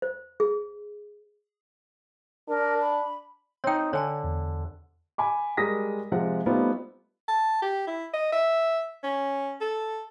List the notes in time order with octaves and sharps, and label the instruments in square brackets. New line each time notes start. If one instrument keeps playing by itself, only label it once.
[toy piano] C5
G#4
[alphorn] D4 [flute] A#4
[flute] B5
[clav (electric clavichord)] C4 D#4 [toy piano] C#5 G5
[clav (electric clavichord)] D3 [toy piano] C#5 G#5 A#5
[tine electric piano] E2
[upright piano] G#5 B5 D6
G3 G#3 A#4 D#6 A#6 B6
C3 F3 G#3 F#5
G3 A3 B3 C4 D#4 F4
[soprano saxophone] A5
G4
E4
D#5
E5
C#4
A4